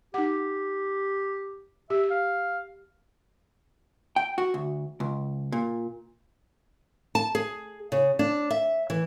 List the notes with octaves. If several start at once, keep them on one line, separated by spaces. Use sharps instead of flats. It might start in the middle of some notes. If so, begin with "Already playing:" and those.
D#4 G4 F#5
G4 E5
F5
G5
F#4
D2
C#2
A#2
A5
G#4
C#3
D4
E5
E3